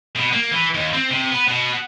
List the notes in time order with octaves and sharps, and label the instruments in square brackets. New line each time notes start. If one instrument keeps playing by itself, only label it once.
[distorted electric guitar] B2
A#3
E3
D#2
C4
C3
B3
B2